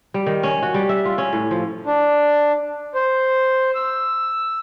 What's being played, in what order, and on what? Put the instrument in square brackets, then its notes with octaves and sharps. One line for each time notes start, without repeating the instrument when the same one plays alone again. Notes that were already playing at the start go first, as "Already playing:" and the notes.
[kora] G3
D#3
C#4
F#4
G3
E5
F4
C#4
A2
F3
[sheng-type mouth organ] D4
C5
E6